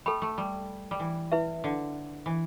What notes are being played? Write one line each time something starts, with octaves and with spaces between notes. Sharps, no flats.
A3 A4 G5 B5
A3
G3
G3
E3
E4 B4 E5
D3
E3